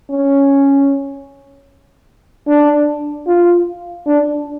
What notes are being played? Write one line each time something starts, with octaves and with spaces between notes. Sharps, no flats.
C#4
D4
F4
D4